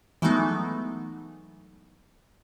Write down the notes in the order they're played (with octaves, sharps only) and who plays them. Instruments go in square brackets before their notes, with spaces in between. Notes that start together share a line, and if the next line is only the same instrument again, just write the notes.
[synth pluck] E3 F#3 G#3 A3 B3 D#4